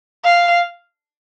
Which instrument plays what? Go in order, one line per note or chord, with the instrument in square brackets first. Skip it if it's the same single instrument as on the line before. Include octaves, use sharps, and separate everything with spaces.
[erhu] F5